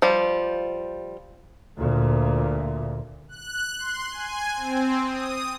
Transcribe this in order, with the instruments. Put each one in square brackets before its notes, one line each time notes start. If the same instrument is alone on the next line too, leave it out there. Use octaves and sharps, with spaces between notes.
[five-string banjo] F3 G3
[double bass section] D2 A#2
[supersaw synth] F#6
C6
G#5
C4
D#6